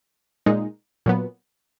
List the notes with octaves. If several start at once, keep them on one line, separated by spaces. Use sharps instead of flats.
A#2 G#3 D#4
A#2 F#3 B3